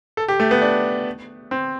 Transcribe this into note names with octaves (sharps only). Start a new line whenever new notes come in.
A4
G4
A3
B3
D4
C4